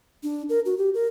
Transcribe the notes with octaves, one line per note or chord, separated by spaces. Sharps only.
D4
A#4
F#4
G4
A#4